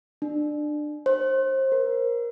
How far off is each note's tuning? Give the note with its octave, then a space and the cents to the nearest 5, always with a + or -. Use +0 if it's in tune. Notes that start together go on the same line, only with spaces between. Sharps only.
D4 +25
C5 +30
A#4 +20